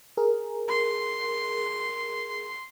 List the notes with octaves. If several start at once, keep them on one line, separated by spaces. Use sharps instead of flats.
G#4 A#4
C6